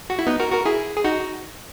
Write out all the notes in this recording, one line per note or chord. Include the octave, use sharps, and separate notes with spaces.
F#4
E4
B3 D#4
F#4 A#4
F#4 A#4
E4 G#4
G#4
D#4 F#4